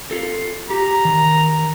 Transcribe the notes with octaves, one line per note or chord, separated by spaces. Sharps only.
F4 A4
G4 A#5
D#3